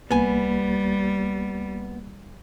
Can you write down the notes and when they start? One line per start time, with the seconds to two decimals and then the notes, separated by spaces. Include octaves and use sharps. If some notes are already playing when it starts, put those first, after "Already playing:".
0.11 C2 G3 A#3 B3 G#5